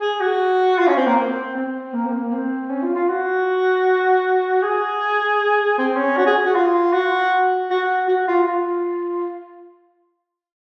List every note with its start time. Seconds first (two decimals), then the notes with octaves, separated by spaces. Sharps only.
0.01 G#4
0.20 F#4
0.78 F4
0.87 C#4
0.97 C4
1.06 A#3
1.16 C4
1.55 C4
1.93 A#3
2.06 C4
2.12 A#3
2.32 C4
2.70 C#4
2.82 F4
2.95 F4
3.09 F#4
4.63 G#4
5.78 C4
5.97 C#4
6.17 F#4
6.26 G#4
6.45 F#4
6.55 F4
6.93 F#4
7.71 F#4
8.08 F#4
8.28 F4
8.47 F4